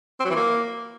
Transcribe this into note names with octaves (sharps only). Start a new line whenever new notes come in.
C4
F#3
E3
A#3